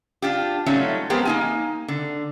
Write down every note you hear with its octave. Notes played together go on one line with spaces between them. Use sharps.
D4 F4 G4
F#3 G3 A3 C#4 D#4 F4
F3 G#3 B3 C4 G4 A#4
A#3 D#4 G#5
D3